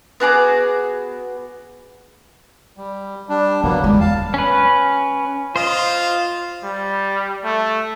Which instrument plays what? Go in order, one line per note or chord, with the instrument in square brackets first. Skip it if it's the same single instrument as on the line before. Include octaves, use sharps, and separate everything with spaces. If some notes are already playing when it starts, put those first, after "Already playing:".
[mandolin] B3 F#4 G#4 D6
[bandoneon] G3
G3 D4
[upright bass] D3 [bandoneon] F#3 A#3 B3
[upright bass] E2 G#3 [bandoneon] G3
[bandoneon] F5 A5
[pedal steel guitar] C#4 B4
[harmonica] F4 [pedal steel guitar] C5 D#5
[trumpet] G3
A3